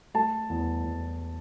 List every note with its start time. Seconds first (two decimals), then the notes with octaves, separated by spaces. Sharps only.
0.14 A3 A5
0.50 E2
0.84 E2